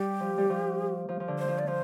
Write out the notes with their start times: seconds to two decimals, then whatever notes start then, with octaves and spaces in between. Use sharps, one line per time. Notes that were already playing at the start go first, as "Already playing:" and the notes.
Already playing: G3 G4
0.20 F3
0.38 G3
0.50 F3
1.09 F3
1.20 F3
1.28 D3
1.39 C5
1.48 F3
1.59 D5
1.68 F3 C5